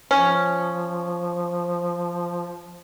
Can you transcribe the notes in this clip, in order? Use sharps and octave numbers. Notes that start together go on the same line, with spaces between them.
F3 C#4